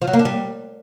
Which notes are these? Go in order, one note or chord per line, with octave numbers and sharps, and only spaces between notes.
F3
F#3
A#3
D4
G3